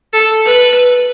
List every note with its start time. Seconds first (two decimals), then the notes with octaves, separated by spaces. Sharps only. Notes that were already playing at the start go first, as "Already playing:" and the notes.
0.13 A4
0.46 B4